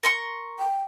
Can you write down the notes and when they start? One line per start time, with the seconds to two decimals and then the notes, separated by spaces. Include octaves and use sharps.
0.03 A#4 C6 C#6
0.59 G5